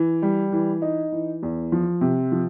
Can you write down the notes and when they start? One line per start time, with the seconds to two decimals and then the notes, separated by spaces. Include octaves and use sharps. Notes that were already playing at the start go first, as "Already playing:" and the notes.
Already playing: E3
0.22 G3
0.52 E3
0.82 D#4
1.12 E3
1.43 E2
1.72 F3
2.01 C3
2.32 F3